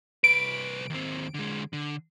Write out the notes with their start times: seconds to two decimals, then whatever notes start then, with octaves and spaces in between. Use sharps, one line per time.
0.24 C2 B4 D7
0.90 D#2 C4
1.34 D3 G#3
1.73 D3